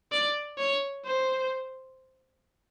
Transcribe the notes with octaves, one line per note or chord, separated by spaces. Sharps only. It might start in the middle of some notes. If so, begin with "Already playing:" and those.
D5
C#5
C5